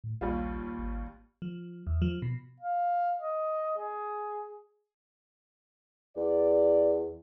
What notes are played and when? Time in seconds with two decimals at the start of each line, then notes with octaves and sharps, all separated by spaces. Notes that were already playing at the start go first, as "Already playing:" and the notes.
0.04 A2
0.21 A#1 D#2 G3 F4
0.79 G#1
1.42 F3
1.87 E2
2.02 F3
2.22 B2
2.60 F5
3.19 D#5
3.78 G#4
6.17 E2 D5